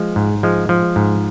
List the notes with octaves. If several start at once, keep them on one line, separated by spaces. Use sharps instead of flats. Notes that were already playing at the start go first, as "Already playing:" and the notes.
Already playing: F3 G#3
G#2
F3 G#3
F3
G#2